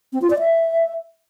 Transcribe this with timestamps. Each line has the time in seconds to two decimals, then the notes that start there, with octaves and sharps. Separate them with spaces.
0.13 C4
0.22 F4
0.30 D5
0.39 E5